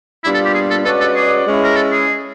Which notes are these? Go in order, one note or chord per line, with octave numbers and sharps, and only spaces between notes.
A#2 G3 B3 D4 E4 F4
A4
G4
G#4
A4
G#3 C#4 F#4 A4 B4 D5
A4
G#4
G#3 C#4 E4
A#4
A4
G#4